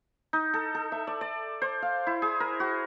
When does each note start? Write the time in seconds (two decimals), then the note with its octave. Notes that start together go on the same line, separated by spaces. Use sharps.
0.33 D#4
0.54 A4
0.75 A4
0.92 E5
1.07 D5
1.21 D5
1.62 C5
1.82 F5
2.07 E4
2.22 G#4
2.40 A#4
2.60 F#4